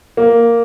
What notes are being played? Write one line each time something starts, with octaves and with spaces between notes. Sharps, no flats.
A#3